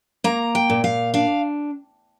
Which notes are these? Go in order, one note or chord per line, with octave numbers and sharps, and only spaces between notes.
A#3 A#5
G5
A#2
F5
D4 F5